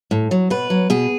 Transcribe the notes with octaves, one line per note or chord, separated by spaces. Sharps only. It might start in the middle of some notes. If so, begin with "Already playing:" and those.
A2
F#3
B2 B4
F#3
B2 G#4